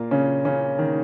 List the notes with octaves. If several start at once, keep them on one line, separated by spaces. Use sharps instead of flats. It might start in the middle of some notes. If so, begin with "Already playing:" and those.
Already playing: A#2 A#3
C#3 C#4
C#3 C#4
D#3